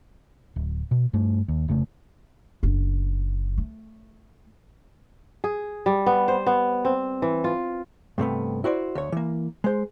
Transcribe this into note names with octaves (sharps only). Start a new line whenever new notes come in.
D1
B2
G2 A3
D#2
F1 C#3 A3
F#1 D4
A3
G#4
G3
B3
C5
B3
C4
E3
F4
G2 C3 A3 B3
E4 F#4 C5 D5
D2 C#5
E3 A#3
G#3 C5